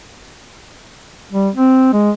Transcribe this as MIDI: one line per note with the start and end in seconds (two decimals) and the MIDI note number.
1.32 1.49 55
1.55 1.92 60
1.93 2.10 56